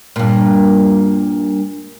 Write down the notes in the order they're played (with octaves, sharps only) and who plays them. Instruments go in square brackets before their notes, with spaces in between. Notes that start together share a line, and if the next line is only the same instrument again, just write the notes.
[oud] G2 A#2